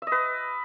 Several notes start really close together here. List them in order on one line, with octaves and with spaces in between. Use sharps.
E5 D#5 B4